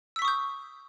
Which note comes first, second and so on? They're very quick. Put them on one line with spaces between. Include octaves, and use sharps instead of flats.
E6 B6 C#6 D#6 G6